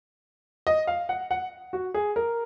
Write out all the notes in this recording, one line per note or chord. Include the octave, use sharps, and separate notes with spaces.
D#5
F5
F#5
F#5
F#4
G#4
A#4